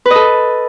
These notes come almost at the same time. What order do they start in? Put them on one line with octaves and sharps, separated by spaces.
B4 D#5 A4